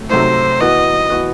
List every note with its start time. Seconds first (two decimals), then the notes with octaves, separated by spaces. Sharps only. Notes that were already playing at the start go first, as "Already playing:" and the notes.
Already playing: C3 F#3 A3
0.10 C3 F#3 A3 D#4 C5
0.61 E3 B3 F#4 B4 D#5
1.10 E3 B3 F#4 B4